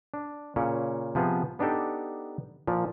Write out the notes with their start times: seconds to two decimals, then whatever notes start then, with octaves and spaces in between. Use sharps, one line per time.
0.14 D4
0.56 A#2 C#3 C#4
1.15 C3 F3 B3 G#4
1.59 B3 D4 D#4 G4 A4
2.67 A#2 F3